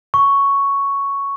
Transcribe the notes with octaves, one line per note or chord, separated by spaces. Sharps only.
C#6